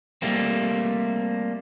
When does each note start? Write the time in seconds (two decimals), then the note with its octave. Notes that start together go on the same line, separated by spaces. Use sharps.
0.22 G3 A3 A#3 C4